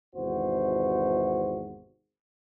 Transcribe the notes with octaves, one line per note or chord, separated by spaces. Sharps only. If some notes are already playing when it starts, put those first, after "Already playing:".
G#1 E2 C3 F#4 C5